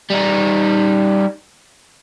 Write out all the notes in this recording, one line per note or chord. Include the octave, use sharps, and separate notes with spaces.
G3 D#4